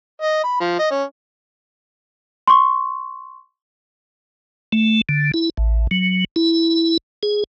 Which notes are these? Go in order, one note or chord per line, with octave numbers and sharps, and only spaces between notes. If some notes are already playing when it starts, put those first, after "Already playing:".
D#5
B5
F3
D#5
C#4
C6 C#6
A3
D3
E4
A1
F#3
E4
G#4